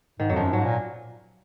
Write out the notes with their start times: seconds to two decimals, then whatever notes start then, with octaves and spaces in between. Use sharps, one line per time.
0.20 G#2 D#3
0.29 F2 F#3
0.36 F3
0.42 F#2
0.53 G#2 F#3
0.65 A#2